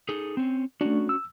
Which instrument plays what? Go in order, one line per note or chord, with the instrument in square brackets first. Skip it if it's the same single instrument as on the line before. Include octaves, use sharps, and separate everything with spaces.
[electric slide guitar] D#4 G#4 A4
C4 C#4
[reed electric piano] A3 D4 [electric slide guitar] C#4 F#4
[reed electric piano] E6